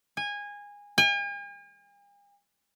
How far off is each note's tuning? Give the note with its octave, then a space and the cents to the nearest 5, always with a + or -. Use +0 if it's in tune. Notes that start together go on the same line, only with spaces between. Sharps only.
G#5 -20
G#5 -45